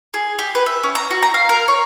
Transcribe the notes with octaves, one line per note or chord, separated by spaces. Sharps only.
G#4
G4
B4
E5
C#4
A#5
F#4
A#5
F5
A#4
C#5